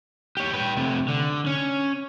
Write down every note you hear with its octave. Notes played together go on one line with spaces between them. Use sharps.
G4 C#5
B4 G5
C3 A3
D3
C#4